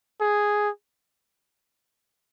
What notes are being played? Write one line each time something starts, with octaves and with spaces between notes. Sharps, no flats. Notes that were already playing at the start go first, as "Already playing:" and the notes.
G#4